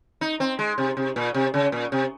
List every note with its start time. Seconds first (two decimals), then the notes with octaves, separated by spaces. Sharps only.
0.21 D#4
0.40 C4
0.59 G#3
0.78 C3
0.97 C3
1.16 A#2
1.34 C3
1.54 C#3
1.72 A#2
1.92 C3